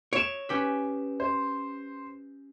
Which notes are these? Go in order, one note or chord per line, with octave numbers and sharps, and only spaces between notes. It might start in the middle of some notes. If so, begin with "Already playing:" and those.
C#5 D7 E7
C#4 G4 B4
C5